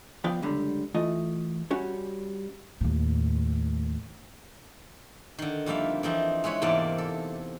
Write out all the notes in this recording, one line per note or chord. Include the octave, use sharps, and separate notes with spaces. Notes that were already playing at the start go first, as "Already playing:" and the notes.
F3 B3 D5 F5 G5
C#2 F#2 D3 G3
E3 A3 F4 D#5
G3 C#4 F#4
D#2 A2
D3 D#3
F2 G3 A#3 E5 F5
E3 F3 C4 D#4
G#3 E4 B4 C#5
E2 G#2 C3 A#3 D5 A5
A4